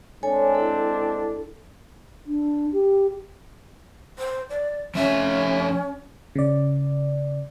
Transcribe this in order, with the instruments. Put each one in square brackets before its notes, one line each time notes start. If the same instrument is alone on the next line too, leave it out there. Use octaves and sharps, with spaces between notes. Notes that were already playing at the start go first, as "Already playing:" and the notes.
[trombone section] G#3 C4 D4 [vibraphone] A4 C#5 G#5
[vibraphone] E4 A4
[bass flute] D4
G4
[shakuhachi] C5
D5
[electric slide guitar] F3 A3 E5 [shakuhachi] C#4
[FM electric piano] C#3 D5